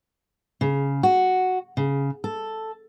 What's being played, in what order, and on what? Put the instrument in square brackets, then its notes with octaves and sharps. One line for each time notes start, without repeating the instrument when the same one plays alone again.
[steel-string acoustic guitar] C#3
F#4
C#3
A4